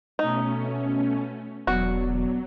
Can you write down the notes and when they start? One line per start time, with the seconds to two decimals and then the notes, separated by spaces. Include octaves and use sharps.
0.19 B2 A3 C#4 D#4
1.67 E1 B2 F#3 D4 F#4 D5